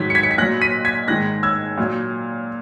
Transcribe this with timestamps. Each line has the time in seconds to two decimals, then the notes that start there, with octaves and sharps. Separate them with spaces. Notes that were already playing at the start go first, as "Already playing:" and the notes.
Already playing: G#2 D#3 F#3 G#6 B6
0.10 C#7
0.15 G#6 B6
0.23 C#7
0.31 B6
0.38 A#2 F#6 A#6
0.42 F#3
0.61 B6 D#7
0.85 G#6 B6
1.08 G#2 D#3 G#3 F#6 A#6
1.43 E6 G#6
1.78 A#2 F#3